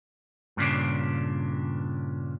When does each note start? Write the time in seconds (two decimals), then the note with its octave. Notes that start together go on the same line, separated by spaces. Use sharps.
0.57 G2 A#2 C#3 D4